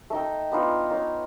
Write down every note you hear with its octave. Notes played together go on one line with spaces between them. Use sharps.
A3 D#4 G5
B3 D4 D#4 F4
D#4 F4 C#5